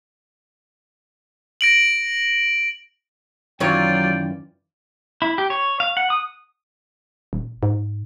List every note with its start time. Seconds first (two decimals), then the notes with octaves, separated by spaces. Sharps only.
1.61 A#6 D7 F#7
3.60 F#2 D#3 E3 F#3 F4 C#5 D5 G5
5.22 E4
5.38 G4
5.50 C#5
5.80 F5
5.97 F#5
6.10 D#6
7.33 D#1
7.63 G#2